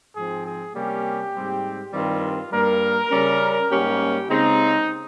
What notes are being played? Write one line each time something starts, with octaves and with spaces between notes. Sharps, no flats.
G#2 F3 C4 G#4
G#4
C3 G3 A#3 C#4 G4
G#2 G3 C4
G2 D#3 G3 C4 F4
G2 G3 A#3 A#4
C#3 G3 C#4
G#2 G3 A#3 C#4 G4
C#3 G#3 C4 D#4